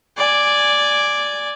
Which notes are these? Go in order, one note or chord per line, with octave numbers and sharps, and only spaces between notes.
D5 G#5